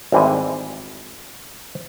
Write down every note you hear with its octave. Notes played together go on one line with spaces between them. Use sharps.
G#1 E3 G3 G#3 G#5